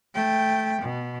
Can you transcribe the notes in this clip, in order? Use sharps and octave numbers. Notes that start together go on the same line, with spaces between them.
A3 G5
B2